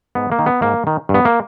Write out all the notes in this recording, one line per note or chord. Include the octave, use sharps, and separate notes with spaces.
G#2 B3
A#3
D#3
B3
G#2 A#3
D#3
G2
B3
A#3